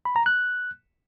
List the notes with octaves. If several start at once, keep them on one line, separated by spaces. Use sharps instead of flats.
B5
A#5
F#6